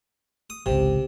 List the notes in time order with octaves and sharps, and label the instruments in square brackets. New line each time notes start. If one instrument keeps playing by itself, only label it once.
[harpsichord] D#6
[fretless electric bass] G#1 C#2 [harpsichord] C3